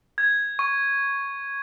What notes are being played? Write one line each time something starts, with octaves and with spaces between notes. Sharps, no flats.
G#6
C#6